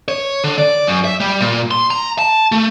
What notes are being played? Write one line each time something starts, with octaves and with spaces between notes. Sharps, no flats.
C#5
D3
D5
F#2
E5
G3
A#2
C6
A#5
A5
A3